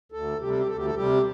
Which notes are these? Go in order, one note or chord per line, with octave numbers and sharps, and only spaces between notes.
D2 A4
C3 G3 G4
A4
G4
D2 A4
G4
A4
C3 G3 G4